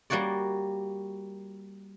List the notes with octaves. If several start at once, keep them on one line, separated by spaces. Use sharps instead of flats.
G3 A#3 F#4 C#5 D5